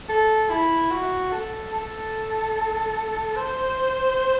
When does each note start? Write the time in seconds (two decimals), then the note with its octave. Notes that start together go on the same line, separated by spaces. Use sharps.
0.09 A4
0.50 E4
0.91 F#4
1.32 A4
1.73 A4
3.36 C5